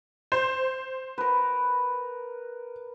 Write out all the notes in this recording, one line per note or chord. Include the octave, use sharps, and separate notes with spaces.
C5
A#4 B4